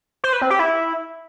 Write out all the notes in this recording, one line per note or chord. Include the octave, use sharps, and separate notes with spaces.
C5
B4
C4
G4
E4